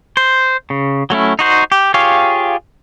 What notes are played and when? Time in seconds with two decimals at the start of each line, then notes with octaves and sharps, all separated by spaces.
0.17 C5
0.70 C#3
1.10 F#3 A3 C#4 E4
1.39 D#4 F#4 C5
1.72 G4
1.94 F4 G4 G#4 C#5 F5